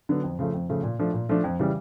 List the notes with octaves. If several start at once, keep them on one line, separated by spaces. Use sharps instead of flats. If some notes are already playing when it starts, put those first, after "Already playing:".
D3 F#3 B3
F2
C#3 F3 A3
F2
C#3 F3 A3
A#2
F3 A3 D4
A#2
F3 A3 D4
F2
C#3 E3 G3